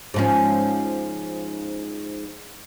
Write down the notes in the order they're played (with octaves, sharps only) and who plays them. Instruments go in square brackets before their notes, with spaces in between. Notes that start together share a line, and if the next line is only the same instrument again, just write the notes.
[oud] G#2 F3 C#4